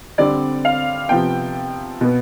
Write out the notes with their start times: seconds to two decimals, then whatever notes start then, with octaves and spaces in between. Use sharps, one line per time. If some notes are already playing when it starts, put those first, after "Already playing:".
0.18 D3 G3 C4 D5
0.65 F5
1.09 C3 F3 B3 G5
2.01 B2 B3